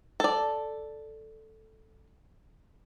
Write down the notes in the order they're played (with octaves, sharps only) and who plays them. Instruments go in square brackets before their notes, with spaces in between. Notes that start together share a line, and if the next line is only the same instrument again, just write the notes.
[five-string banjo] A4 D5